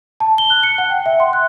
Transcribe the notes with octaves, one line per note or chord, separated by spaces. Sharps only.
A5
G7
F#6
C#7
F#5
G5
E5
C6
F#6